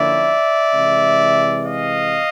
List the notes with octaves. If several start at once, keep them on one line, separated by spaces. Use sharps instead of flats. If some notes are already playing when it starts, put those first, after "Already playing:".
Already playing: D3 F3 A#3 C#4 E4 D5 E5
C3 E3 G#3
D#5 F5